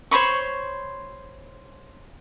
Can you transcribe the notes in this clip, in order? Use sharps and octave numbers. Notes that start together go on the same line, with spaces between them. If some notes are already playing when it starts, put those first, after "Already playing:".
C5 C#5 B5 C#6